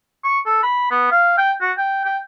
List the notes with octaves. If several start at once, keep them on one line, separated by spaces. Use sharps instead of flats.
C#6
A4
B5
B3
F5
G5
F#4
G5
G5